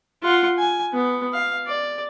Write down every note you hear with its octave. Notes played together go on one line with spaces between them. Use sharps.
F4 F#5
G#5
B3
F5
D5